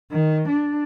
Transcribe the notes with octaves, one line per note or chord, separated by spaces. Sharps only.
D#3
D4